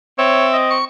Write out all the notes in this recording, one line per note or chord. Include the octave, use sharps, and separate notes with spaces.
C4 C#5 E5
D#5
C#6